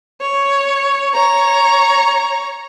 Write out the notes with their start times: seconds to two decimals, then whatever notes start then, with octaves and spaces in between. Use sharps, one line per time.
0.21 C#5
1.14 C#5 A#5